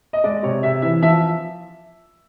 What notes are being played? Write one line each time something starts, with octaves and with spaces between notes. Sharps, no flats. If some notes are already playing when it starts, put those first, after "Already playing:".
D#5
G#3 D5
C3 C#5
C3 E5
E3 E5
F3 E5